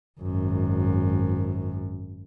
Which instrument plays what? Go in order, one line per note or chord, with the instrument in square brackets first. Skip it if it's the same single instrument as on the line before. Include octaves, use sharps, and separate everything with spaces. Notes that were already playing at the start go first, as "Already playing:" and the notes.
[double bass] G#1 F#2